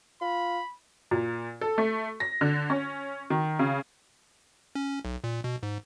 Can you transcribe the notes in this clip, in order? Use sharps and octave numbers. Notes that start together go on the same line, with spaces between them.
F4 B5
A#2
A4
A3
A#6
D3
C#4
D#3
C#3
C#4
B1
A#2
B2
G#2